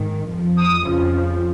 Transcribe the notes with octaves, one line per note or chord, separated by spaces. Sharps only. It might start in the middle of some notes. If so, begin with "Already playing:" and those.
Already playing: G#2 D#3
F2 F3
D#6
F2 C#3 F3